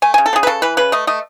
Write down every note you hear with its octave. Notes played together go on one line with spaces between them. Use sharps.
A3 G#5
C#3 G#5
A4
C#3 G#4
B4
C#3 A4
E3 B4
C#3 B4
A3 D#5
A3 D#5